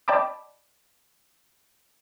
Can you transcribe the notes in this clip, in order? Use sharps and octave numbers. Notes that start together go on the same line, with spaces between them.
D5 D#5 G5 A5 B5 D6